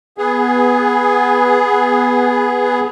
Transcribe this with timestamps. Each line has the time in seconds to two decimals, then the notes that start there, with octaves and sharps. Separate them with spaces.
0.18 B3 G#4